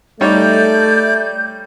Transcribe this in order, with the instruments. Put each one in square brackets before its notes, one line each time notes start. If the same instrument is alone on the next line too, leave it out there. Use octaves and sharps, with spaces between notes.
[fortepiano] G3 D#4 C#5 [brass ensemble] A3 [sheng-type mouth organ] D5 [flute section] G6